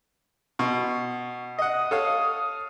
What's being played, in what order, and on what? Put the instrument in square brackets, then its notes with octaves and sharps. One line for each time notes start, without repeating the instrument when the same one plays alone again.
[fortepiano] B2 C#6
[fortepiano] D#5 F#5 [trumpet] D#6
[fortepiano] A4 C#5 F5